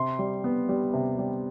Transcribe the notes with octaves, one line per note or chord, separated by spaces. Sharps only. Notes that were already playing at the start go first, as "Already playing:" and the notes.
Already playing: C3 C6
G3
B3
G3
C3
G3